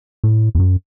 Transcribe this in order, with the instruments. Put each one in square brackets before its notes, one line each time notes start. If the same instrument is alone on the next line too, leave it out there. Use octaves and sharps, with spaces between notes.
[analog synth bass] A2
E2
F#2